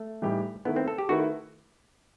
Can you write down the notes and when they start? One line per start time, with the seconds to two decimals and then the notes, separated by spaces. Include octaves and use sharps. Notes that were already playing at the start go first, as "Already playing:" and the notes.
Already playing: A3
0.22 A2 E3 G3 D#4 G4
0.65 D#3 A3 B3 E4 B4
0.76 C4
0.88 A4
0.98 G4
1.09 D#3 A3 E4 F#4 B4